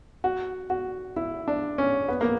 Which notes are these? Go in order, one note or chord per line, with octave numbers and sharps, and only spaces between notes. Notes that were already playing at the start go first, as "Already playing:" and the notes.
F#4
F#4
E4
D4
C#4
B3
A#3